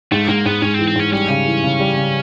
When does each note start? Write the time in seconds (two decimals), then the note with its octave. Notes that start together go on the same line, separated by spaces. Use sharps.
0.12 G#2 A3
0.28 G#2 A#3
0.45 G#2 B3
0.62 G#2 C#4
0.74 C4
0.79 E3
0.88 C4
0.96 G#2 C#4
1.12 G3 C#4
1.29 C#3
1.46 E3
1.63 C#3
1.80 G3
1.97 C#3